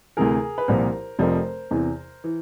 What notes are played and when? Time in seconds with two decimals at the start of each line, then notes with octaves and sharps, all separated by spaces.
0.17 D2 C3 E3 G#4 A#4
0.58 B4
0.68 C2 A#2 F3 A#4 C5
1.19 F1 F2 C3 F3 A#4 C5
1.71 E2 C3 E3
2.24 E3